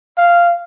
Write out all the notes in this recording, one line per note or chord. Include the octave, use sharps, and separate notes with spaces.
F5